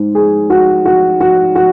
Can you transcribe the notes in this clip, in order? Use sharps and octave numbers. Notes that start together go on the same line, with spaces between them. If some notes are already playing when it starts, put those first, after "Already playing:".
Already playing: G#2
G#4
F#4
F#4
F#4
F#4